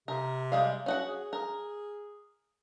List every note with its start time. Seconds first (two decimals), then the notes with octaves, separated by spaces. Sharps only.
0.08 C3 A#4
0.52 G3 G#3 F5
0.86 C#4 F#4 F#5
1.08 G#4
1.33 A#4